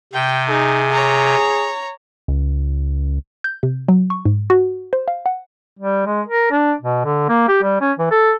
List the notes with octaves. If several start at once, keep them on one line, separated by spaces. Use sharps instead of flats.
C3 G5
D#4 G#4
C#5 A#5
C#2
G6
C3
F#3
C#6
G#2
F#4
C5
F5
F#5
G3
G#3
A#4
D4
B2
D3
A#3
G4
G3
C#4
E3
A4